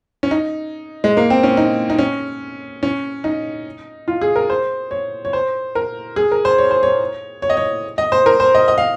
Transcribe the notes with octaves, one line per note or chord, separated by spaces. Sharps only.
C#4
D#4
G#3
A#3
C4
C#4
D#4
D#4
C#4
C#4
D#4
F4
G#4
A#4
C5
C#5
C#5
C5
A#4
G#4
A#4
C5
C#5
C5
C#5
C#5
D#5
C#5
D#5
C5
A#4
C5
D#5
D#5
F5